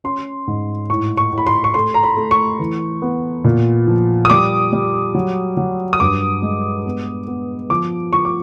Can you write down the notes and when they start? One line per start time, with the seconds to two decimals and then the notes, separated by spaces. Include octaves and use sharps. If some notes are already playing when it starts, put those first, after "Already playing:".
0.04 C#4 C6
0.47 G#2
0.90 A2 C#6
1.17 C#6
1.32 A2
1.38 B5
1.47 C6
1.64 C#6
1.74 A3 C6
1.94 A#5
2.03 B5
2.17 A3
2.31 C#6
2.59 E3
3.02 B3
3.44 A#2
3.87 F3
4.25 D#6
4.30 G3 D6
4.73 G3
5.15 F#3
5.57 F#3
5.93 D#6
6.00 G2 D6
6.42 G#3
6.86 B3
7.27 B3
7.70 F3 D6
8.13 F3 C#6
8.25 D6